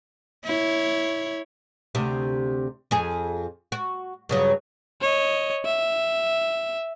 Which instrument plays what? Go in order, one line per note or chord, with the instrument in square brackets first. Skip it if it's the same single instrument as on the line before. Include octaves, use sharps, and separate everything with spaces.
[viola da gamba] E4 C#5
[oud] D2 C3
F2 G#4
F#4
G2 C#3 F#3
[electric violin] C#5 D#5
E5